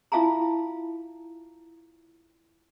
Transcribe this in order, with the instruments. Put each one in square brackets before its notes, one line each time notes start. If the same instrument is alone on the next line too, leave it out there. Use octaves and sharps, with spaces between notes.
[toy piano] E4 F4 E5 F5 A5 A#5